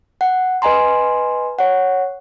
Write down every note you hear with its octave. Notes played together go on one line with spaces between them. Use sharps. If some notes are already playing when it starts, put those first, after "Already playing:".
F#5
B4 D#5 G#5 A#5 C6
C#5 F#5